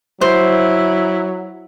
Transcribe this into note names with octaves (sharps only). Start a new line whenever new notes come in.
F#3 E4 C5